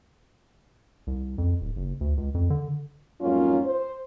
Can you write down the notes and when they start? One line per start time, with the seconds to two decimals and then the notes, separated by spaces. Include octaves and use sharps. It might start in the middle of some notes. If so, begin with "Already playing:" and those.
1.07 C2
1.38 F2
1.61 D1
1.76 F#1
2.01 D2
2.17 C#2
2.34 F2
2.50 D3
3.21 F2 G#2 F#3 A#3 C#4 F4
3.65 C5